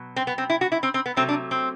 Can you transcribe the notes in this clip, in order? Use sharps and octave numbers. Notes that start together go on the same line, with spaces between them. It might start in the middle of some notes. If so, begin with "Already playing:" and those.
Already playing: B2 F#3
C4
B3
C4
E4
F#4
E4
C4
C4
B3
C3 F#3 A3 C4
D4
C4